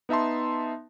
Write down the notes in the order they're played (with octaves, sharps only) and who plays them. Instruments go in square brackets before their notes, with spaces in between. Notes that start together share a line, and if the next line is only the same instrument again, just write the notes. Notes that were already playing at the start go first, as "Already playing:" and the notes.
[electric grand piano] B3 D#4 E5 A5 C6